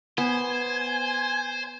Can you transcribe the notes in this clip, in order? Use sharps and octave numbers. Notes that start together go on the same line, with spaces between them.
B3 C5 G#5